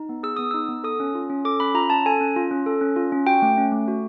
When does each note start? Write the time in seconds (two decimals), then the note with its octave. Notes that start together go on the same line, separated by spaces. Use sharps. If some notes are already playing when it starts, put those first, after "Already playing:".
Already playing: D#4
0.09 B3
0.23 G#4 E6
0.37 B3 D#6
0.51 D#4 E6
0.69 B3
0.84 A4 D#6
1.00 C#4
1.15 F4
1.30 C#4
1.45 A4 D6
1.60 C#4 B5
1.75 F4 A#5
1.90 C#4 A5
2.06 A4 G#5
2.21 C#4
2.36 F4
2.51 C#4
2.66 A4
2.81 C#4
2.96 F4
3.12 C#4
3.27 F#4 G5
3.42 A3
3.57 C#4
3.72 A3
3.88 F#4